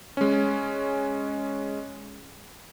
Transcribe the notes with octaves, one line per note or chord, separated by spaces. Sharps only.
G#3 C#4